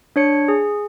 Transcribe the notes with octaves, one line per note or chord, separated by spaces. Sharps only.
D4 C#5 C#7
G#4